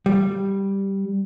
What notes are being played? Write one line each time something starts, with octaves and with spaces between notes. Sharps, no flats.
G3